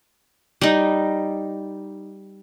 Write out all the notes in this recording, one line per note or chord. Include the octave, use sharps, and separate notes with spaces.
G3 D#4